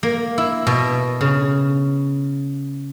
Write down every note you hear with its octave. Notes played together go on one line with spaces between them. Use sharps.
A#3
E4
B2
C#3